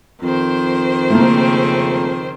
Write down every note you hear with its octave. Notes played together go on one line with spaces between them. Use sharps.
F2 D#3 C5
C#3 A3 A#3 C4